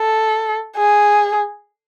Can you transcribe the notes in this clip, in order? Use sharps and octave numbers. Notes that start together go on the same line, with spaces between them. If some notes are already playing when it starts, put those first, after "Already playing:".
Already playing: A4
G#4